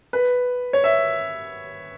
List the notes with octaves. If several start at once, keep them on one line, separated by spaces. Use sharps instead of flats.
B4
C#5
E5